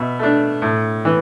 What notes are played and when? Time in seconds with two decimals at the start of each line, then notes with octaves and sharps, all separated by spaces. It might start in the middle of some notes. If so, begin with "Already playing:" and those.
Already playing: B2 E5
0.19 A3 D4
0.62 A2
1.05 E3